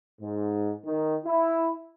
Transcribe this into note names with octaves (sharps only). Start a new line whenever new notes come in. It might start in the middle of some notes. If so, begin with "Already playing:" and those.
G#2
D#3
E4